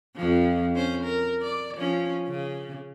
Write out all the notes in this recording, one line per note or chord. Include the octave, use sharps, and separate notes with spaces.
F2 F3
C#4 C5
A#4
D5
F3 C#4
C#3